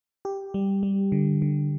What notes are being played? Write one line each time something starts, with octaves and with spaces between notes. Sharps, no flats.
G4
G3
G3
D3
D3